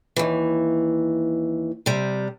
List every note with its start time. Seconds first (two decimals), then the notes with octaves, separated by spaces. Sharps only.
0.16 D#2 E3
1.86 C3 G3